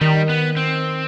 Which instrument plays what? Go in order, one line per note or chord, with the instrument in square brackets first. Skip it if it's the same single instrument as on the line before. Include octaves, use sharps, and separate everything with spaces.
[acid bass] D#3 [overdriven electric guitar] G3
[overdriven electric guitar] B3
C4